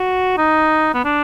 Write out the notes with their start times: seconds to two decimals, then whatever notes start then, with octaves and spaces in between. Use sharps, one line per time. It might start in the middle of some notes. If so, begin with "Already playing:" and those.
Already playing: F#4
0.37 D#4
0.94 B3
1.05 D4